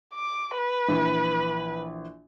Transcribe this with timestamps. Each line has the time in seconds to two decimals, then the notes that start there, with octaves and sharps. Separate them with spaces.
0.14 D6
0.57 B4
0.88 A#1 E3